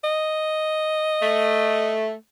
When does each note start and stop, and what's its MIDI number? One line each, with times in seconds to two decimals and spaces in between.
0.04 1.94 75
1.21 2.13 57